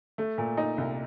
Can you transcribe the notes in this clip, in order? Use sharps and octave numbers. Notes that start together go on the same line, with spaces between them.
A3
A#2
D#4
C2